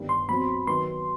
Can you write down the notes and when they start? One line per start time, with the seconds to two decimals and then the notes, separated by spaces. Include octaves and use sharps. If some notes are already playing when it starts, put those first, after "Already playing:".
Already playing: G1 G2 D#3 G3
0.09 C6
0.28 B2 F#3 C4 F#4 B5
0.67 D#3 F#3 B3 C6